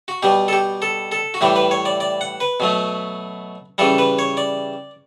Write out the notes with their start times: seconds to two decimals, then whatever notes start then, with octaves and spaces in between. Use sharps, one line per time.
0.08 F#4
0.23 B2 G3 G4
0.48 A4
0.53 G4
0.82 A4
1.12 A4
1.34 F#4
1.41 A2 E3 G3 G4
1.56 B4
1.71 C#5
1.85 D5
2.00 D5
2.21 F#5
2.40 B4
2.60 B2 F#3 A3
3.78 C#3 E3 G3 A4
3.98 B4
4.19 C#5
4.37 D5